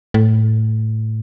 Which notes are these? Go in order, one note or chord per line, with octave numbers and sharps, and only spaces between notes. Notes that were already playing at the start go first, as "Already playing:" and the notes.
A2